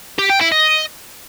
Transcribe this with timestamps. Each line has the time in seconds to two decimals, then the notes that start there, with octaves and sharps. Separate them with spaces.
0.18 G4
0.30 G5
0.41 E4
0.52 D#5